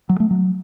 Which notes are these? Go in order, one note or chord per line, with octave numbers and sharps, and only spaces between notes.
F#3
A3
F#3